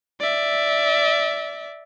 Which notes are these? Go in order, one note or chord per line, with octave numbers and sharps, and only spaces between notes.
D5 E5